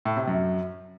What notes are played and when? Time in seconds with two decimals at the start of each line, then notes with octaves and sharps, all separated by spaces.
0.05 A2
0.17 C3
0.28 F#2